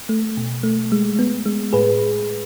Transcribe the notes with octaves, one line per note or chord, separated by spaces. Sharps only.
A3
B2
A3
G#3
B3
G#3
A2 G#4 B4